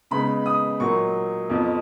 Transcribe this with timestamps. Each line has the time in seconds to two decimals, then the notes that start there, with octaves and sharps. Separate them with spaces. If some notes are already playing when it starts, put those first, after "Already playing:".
0.11 C#3 G#3 B3 D#4 B5
0.46 D#6
0.80 A#2 F#3 A#3 D#4 C#6
1.50 F2 F3 B3 D#4